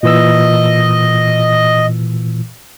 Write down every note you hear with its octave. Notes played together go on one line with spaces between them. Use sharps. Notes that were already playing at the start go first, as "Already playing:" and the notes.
A#2 E3 D#5 E6